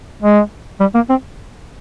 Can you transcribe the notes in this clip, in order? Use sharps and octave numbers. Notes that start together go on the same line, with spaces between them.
G#3
G3
A#3
C4